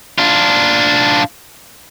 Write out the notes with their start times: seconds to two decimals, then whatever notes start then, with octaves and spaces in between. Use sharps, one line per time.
0.18 D4 F4